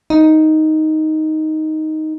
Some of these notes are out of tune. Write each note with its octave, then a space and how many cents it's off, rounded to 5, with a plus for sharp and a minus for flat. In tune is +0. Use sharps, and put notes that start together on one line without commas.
D#4 +5